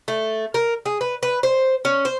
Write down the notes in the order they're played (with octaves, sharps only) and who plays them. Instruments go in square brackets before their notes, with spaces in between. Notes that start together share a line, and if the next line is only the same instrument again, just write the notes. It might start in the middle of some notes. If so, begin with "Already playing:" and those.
[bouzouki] A3
A#4
G#4
B4
B4
C5
C#4
C5